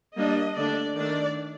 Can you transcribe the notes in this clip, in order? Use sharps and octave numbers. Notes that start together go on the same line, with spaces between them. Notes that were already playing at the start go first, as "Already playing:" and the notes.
G3 A#3 D4 D#5
D3 A3 D4 D5
D#3 A3 D4 D5